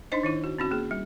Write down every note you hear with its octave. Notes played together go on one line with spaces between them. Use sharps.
D4 D#4 C5 D#5
D#3 D#4 E4
F#4
C4 C#4 F#4
A#3 G#4
G3